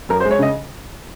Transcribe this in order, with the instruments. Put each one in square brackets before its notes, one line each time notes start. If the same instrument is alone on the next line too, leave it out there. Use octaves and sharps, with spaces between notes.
[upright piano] F#2 A#4
C5
G#3
C#5
C#3 D#5